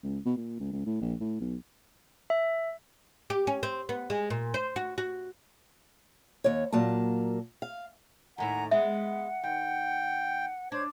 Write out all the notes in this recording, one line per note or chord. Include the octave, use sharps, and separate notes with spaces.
C#2
B2
A#2
C#2
C#2
A2
A#1
A2
B1
E5
G4
C#4
C4
B3
G#3
A#2
C5
F#4
F#4
D#2 C#5
A#2 F#3 A#3 A5
F5
D#2 A2 E4 F#5 G#5 A#5
G#3 B3 E5 F#5
D#2 G5
D4 C5 C#5 G#6